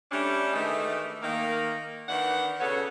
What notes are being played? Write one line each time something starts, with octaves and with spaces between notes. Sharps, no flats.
G3 A3 C#4 D4
D#3 E3 G#3 A3
D#3 A#3
D#3 E3 D4 F#5
C#3 B3 F#4 A4 C#5